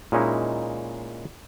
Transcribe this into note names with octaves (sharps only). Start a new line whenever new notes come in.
A#2 G#3 C#4 D#4 E4